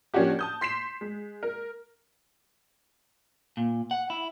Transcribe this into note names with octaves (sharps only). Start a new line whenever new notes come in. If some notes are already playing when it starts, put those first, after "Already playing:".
F3 A#3 C#4 D4 F#4 G4
A5 D#6 G6
C6 B6 C7 E7
G#3
A#4
A#2
F#5
E4